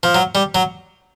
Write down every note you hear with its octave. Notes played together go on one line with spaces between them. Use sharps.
F3
F#3
G3
F#3